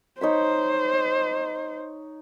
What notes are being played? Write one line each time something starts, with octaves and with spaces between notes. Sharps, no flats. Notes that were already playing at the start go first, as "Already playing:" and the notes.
D#4 C5 C#5 B5